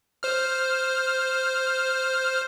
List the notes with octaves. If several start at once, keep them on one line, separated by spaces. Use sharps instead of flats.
C5 F6